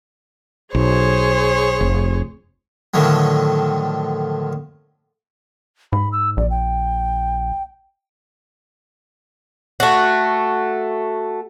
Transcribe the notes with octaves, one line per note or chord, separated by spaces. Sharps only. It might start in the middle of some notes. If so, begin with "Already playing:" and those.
B1 G#4 C5 C#5
F1
A2 D3 D#3 F3 F#3
G#2 B5
E6
A#1 D5
G5
A3 F#4